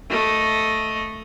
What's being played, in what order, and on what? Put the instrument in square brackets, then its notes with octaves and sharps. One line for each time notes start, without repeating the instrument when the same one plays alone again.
[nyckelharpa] A3 D#5